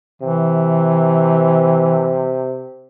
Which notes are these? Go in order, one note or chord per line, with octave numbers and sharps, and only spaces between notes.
C3 E3